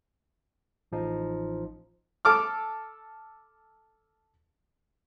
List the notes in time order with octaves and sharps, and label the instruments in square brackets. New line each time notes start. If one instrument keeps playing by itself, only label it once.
[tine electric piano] A1 F3 D#4
[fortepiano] A4 D6 F6